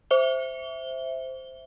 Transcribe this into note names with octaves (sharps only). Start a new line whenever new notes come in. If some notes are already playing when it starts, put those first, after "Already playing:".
C5 E5 G7